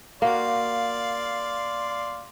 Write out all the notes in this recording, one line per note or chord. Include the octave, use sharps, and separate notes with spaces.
A#3 F#4 D5 F5 C6